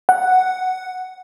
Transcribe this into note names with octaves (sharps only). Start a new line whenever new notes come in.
F#5